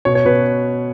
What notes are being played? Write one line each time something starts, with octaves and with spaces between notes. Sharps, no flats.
B2 C#5
C#5
B2 B4